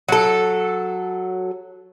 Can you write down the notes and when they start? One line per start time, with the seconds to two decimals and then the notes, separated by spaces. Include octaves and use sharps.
0.09 F#3 A4